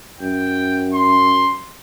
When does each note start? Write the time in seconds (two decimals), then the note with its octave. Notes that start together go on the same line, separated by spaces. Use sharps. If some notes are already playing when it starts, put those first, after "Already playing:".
0.21 F#2 G5
0.94 C6